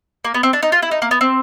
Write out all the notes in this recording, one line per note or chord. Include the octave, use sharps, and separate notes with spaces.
A#3
B3
C4
D4
D#4
F4
E4
D#4
A#3
B3
C4